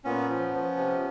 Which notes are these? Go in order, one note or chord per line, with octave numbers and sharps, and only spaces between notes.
A#2 B3 C#4
F3
F3
C3